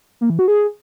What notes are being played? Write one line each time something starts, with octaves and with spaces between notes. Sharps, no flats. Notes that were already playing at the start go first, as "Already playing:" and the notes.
A#3
E3
F#4
G#4